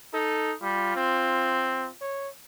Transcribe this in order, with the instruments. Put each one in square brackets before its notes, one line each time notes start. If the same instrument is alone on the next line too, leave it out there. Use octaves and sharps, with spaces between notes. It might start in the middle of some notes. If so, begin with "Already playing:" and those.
[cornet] D#4 [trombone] A4
[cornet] G3 [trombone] F4
[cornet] C4
[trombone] C#5